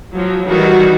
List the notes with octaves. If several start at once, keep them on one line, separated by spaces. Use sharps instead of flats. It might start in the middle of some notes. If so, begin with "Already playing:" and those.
F3 F#3
D#3 E3 G3 F#4 G4